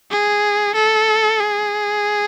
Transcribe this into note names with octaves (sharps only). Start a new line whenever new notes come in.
G#4
A4
G#4